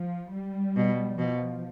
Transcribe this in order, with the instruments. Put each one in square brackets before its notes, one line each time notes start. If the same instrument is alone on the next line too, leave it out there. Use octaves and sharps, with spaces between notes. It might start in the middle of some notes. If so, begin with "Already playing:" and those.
Already playing: [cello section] F3
G3
[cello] B2
[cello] B2 [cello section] F3